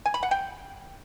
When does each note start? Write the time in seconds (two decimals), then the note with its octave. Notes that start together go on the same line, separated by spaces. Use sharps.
0.06 G#5
0.14 B5
0.23 F#5
0.31 G5